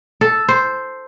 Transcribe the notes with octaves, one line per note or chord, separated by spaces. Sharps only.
A4
C5